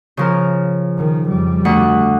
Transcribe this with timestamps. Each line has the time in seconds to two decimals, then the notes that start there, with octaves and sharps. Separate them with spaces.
0.17 C#3 F3 A#4
0.98 D#3
1.27 F2 G3
1.65 D2 F#5